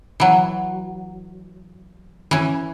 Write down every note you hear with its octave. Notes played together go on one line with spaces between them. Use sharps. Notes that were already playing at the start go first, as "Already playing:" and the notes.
E3 F#3
E3 C#4